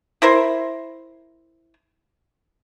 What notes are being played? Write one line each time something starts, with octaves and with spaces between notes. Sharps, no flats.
E4 A#4 C5